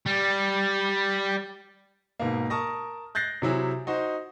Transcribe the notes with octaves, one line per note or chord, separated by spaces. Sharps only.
G3
G#2 B2 A#3
A#4 A5 C#6 D#6 A#6
F#6 G6 A6 A#6 C7
C3 F#3 E4 G#4
D#4 F#4 C5